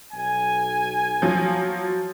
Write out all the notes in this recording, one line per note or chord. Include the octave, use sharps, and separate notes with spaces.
B1 G#5
F3 F#3